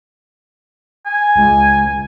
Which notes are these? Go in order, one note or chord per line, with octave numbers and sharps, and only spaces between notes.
G#5
C#2